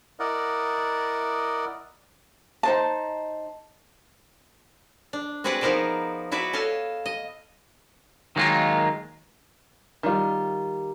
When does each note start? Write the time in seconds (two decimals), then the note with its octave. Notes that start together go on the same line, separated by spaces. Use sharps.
0.20 E4 A#4 D5 D#5 F#5
2.63 D#4 C5 A5
5.13 D4
5.44 C4 F#4 G#4 B4 D5 F#5
5.61 F3 B3 D#4 A#4 C5 D5
6.32 E4 F#4 B4 D5 E5
6.53 A4 C#5 D#5 F5 A5
7.06 D#5
8.36 D#3 F#3 G#3 A#3 D#4 F4
10.03 D#3 G3 F4